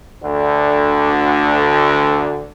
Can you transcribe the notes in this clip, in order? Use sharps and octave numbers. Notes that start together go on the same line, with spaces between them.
D2 D3